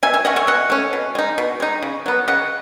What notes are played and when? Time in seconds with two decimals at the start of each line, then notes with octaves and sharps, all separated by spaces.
0.03 B2 E5 G#5
0.14 E5 G#5
0.25 A3 C#4 D#5 F#5
0.36 C#5 E5
0.47 B2 D#5 F#5
0.70 A3 C#4
0.93 B2
1.15 G#3 D#4
1.38 B2
1.60 G#3 D#4
1.82 C#3
2.06 F#3 B3
2.28 C#3 D#5 F#5